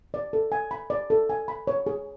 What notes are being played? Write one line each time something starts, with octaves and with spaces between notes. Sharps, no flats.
D5
A4
G#5
B5
D5
A4
G#5
B5
C#5
G#4